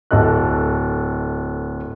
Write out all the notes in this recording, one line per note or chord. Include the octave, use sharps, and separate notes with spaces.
D1 A4 D#5 F#6